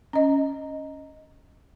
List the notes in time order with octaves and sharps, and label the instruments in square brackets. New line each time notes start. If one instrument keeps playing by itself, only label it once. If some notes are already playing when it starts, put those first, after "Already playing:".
[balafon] C#4 D#5